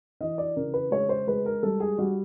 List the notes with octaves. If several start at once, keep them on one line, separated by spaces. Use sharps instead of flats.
E3 D#5
D5
C#3 A#4
B4
G#3 C#5
C5
G#3 B4
A#4
G3 A4
G#4
G3 F#4